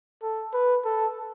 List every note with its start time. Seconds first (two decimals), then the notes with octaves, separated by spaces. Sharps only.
0.23 A4
0.54 B4
0.85 A4